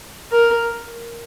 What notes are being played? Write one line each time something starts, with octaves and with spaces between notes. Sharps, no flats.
A#4